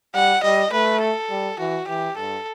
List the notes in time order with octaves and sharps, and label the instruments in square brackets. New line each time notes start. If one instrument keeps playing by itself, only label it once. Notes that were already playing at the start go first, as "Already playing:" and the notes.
[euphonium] G3 [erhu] F#5
[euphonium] G3 [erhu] D#5
[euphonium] A3 [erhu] B4
[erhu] A4
[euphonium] G3
[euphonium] E3 [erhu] F#4
[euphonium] E3 [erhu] G4
[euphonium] G2 [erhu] A4